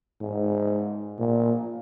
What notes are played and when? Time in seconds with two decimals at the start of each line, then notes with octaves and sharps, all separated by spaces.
0.21 G#2
1.19 A#2